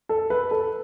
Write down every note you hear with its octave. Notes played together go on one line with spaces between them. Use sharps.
A4
B4
A4